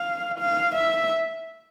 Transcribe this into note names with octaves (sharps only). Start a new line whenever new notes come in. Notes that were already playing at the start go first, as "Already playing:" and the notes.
Already playing: F5
F5
E5